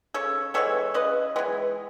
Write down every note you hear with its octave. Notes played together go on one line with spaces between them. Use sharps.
C#3 A4 C#5
E3 G#3 B3 A4 C#5
C#3 B4 D#5
E3 G#3 B3